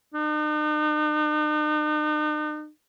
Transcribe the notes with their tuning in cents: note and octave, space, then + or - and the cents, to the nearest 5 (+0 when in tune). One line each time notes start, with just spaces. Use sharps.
D#4 -45